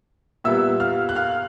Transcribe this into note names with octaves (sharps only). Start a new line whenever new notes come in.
A#2 G3 B3 E5 E6
F5 F6
F#6
F5 F6